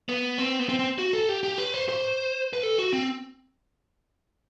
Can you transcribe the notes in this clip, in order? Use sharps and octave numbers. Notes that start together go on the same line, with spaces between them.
B3
C4
B3
C4
C4
F#4
A4
G4
G4
B4
C5
C5
B4
A4
F#4
C4